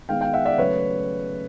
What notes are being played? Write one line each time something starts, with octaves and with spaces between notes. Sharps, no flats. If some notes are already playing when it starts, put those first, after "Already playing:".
D#3 G#3 B3 F5 G5
F5 G5
E5 F#5
D5 E5
C#3 F#3 A3 B4 C#5